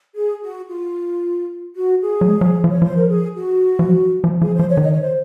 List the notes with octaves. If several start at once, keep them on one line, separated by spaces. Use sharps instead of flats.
G#4
F#4
F4
F#4
G#4
F#3
G#3
F#3
F3
F3
C#5
F3 C5
A#4
G#4
F#4
F3
F#3
F3
F3 G#4
C5
F3
C#5
D#3 D#5
C#5
C5